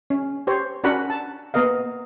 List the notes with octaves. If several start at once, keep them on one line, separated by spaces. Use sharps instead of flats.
C#4
G4 C5 C#5
C#4 D4 F#4 A#4 F#5 B5
A5
A#3 B3 A#4 D#5 F5